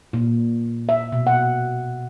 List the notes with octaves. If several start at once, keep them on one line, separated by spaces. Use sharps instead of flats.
A#2
E5
B2
F#5